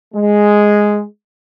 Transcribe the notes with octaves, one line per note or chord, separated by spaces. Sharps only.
G#3